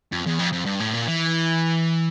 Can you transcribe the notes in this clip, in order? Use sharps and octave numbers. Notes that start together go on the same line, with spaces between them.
F2
E2
F2
F2
G2
A2
A#2
E3